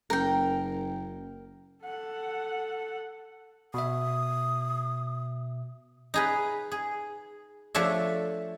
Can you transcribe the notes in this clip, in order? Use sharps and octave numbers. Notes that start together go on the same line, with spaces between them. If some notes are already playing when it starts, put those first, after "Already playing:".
F#1 A#4 G5
A4 F#5
B2 E5 D#6
D#4 G#4 B4
G#4
F3 A3 D4 C#5 E5